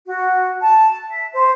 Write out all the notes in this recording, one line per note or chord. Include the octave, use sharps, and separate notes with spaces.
F#4
A5
E5
C5